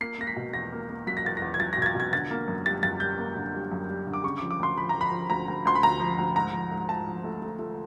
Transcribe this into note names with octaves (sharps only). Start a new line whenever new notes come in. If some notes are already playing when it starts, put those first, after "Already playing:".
A#3 C7
A#3 A#6
B6
B2
E2 A#6
A#3
A#3
F#3 B6
A#6
E2 A6
E2 A#6
G#6
F#3 A6
A#6
B2 G#6
A6
B2 G#6
D3 A6
A#3
F#2
G3 A6
F#2 A6
G3 G6
A#3
D3
G3
F#2
G3
D3
D6
C#3 C#6
D6
F3
D6
D2 C6
F3 B5
F3 A#5
B5
F3
D2 A#5
D2
D2 C6
B5
D2 A#5
F3
D2
G#2 A#5
F3
G#2
G#2 A5
F3
A3
A3
A3